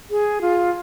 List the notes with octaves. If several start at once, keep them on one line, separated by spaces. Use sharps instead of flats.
G#4
F4